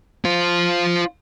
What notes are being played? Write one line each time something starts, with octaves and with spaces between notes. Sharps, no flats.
F4 C5